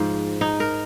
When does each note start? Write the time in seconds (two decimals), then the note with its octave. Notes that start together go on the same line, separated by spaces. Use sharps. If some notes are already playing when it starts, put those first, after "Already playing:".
Already playing: G#2 F3
0.41 D#4
0.60 A#4